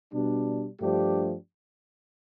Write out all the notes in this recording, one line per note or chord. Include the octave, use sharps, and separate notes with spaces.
B2 G3 D4
G2 F3 A3 D4 G4